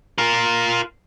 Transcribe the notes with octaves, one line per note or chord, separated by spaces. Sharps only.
F4 A#4